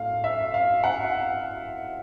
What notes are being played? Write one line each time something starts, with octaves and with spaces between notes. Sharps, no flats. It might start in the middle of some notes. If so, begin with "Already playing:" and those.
Already playing: A2 A3 F5
E5
F5
F#5